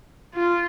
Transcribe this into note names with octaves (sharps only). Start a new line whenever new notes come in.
F4